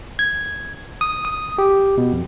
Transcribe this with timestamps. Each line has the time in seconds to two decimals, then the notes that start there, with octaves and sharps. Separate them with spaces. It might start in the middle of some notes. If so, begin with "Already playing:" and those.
0.19 G#6
1.01 D#6
1.25 D#6
1.58 G4
1.98 B2
2.13 F2